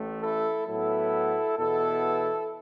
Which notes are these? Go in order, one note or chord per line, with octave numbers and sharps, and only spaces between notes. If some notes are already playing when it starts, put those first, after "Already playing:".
Already playing: A1 A2 A3
E4 A4
A2 F#3 B3 E4 A4
E2 B2 B3 E4 A4